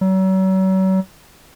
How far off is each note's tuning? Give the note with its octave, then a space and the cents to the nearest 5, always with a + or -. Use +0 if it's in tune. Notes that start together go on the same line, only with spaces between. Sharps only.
F#3 +40